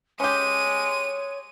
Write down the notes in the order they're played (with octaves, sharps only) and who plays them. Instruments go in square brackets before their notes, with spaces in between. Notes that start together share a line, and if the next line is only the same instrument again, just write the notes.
[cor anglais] G#3 [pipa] C#4 G4 [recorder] C#5 [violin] D#7